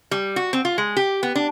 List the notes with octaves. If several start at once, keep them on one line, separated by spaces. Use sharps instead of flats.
G3
F#4
C4
F4
G#3
G4
B3
D4